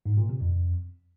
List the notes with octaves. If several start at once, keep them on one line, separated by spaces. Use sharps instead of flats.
G#2
A#2
C3
F2